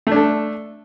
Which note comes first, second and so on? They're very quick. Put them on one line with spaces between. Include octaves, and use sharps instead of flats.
A3 D4 A4